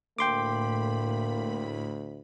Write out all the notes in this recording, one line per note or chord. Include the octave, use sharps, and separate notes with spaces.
D2 A2 A#3 G5 B5 C6 D6